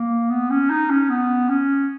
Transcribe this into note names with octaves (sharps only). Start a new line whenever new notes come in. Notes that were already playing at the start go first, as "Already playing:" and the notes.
Already playing: A#3
B3
C#4
D#4
C#4
B3
C#4